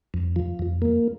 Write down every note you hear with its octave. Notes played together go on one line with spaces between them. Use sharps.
F2
F3
F2
A#3